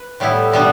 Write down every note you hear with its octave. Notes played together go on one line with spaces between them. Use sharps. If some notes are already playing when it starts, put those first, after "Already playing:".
Already playing: B4
A2 G3 B3 E4
B2 G3 B3 D4